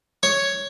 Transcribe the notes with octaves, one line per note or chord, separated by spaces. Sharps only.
C#5